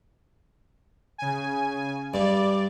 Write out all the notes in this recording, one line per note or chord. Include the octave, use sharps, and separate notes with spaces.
C#3 G#5
G2 D5